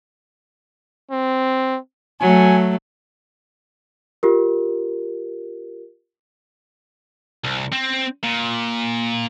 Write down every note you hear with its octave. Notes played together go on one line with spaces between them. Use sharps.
C4
F#3 A3 G#5
F4 G4 A#4
C2
C4
A#2